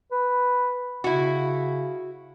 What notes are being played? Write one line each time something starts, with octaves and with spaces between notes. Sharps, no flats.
B4
C#3 E4 F#4